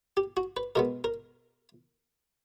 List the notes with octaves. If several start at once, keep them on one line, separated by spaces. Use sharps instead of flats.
G4
F#4
B4
B2 G#3 B3 A#4
A#4